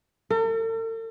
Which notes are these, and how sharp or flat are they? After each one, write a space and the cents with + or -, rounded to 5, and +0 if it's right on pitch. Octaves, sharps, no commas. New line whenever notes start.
A4 +45